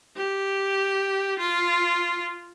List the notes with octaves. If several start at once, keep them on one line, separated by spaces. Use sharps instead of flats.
G4
F4